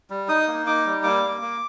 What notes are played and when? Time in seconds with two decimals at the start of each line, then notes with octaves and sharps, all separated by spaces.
0.10 G3
0.28 D#4 D#6
0.47 A#3
0.66 D#4 D6
0.85 G3
1.03 A#3 D6
1.23 A#3
1.42 A#3